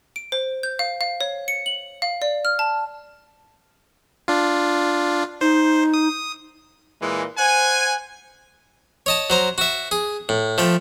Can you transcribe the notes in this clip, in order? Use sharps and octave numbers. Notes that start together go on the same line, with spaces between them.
D7
C5
G6
F5
F5
C#5
C#7
F#7
F5
D5
F6
A5
D4 F4
D#4 C5
D#6
A#2 E3 G#3
C5 F#5 G#5
C#5 D#5 A5
F#3 C5 A#5
F#4 E5
G#4
A2
F3 A3 G5